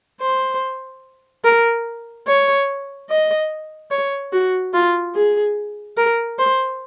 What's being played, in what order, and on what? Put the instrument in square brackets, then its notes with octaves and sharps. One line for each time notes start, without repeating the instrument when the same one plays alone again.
[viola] C5
A#4
C#5
D#5
C#5
F#4
F4
G#4
A#4
C5